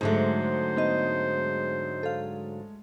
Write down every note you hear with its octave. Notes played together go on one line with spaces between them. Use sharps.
G#2 D3 F#3 G#3 A3 C5
B3 D#4 D#5
A4 F5